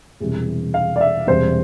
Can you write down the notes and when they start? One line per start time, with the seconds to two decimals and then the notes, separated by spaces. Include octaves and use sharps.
0.20 E1 E2 C3 E3 G3
0.74 F5
0.96 D5
1.01 E5
1.27 E1 E2 C3 G3 C5